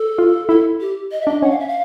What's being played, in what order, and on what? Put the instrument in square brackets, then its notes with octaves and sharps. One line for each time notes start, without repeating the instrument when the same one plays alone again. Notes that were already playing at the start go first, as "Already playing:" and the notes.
Already playing: [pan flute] A4
[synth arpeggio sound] F4
[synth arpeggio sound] E4 [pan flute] A4
[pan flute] G4
D#5
E5
[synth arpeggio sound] D4 [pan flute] D#5
[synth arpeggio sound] C#4 [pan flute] F#5
[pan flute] F5
E5
F5